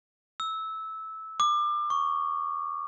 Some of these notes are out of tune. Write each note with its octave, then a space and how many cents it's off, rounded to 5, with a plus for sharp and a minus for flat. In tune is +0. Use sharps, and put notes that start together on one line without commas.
E6 -15
D6 +30
C#6 +10